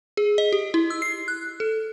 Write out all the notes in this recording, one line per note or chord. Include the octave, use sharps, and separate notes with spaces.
G#4
D#5
G4
E4
E6
C7
F#6
A4